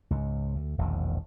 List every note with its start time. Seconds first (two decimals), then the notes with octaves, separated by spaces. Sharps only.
0.11 C#2 G#2
0.55 D2
0.78 E1 A#1 E2 D#3